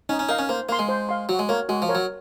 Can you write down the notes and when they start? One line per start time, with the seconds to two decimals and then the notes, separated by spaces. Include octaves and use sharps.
0.09 C#4 D#4
0.19 C#4
0.29 D#4 A#4 F5
0.39 C#4
0.49 A#3 C5
0.69 A#3 F5 C6
0.79 G#3
0.89 C5
1.09 F5 C6
1.29 F#3 F#4
1.39 G#3
1.49 A#3 A#4 C#5
1.69 G#3 F#4
1.82 F3
1.89 A#4 C#5
1.95 F#3